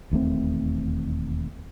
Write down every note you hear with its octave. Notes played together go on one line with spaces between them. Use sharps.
E1 D#2 A3 C4